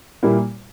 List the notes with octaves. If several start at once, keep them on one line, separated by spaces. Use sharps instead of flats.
A#2 G3 A#3 E4